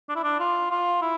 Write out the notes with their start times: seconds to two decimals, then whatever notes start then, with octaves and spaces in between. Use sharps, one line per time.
0.09 D4
0.15 E4
0.23 D4
0.40 F4
0.71 F4
1.02 E4